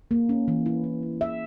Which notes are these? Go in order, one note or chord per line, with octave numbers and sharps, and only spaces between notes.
A#3
C#4
E3
E4
A#3
C#4
E3 E5